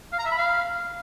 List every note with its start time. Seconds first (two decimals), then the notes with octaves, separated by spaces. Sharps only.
0.13 F5
0.19 A#5
0.25 E5
0.31 B5
0.38 F5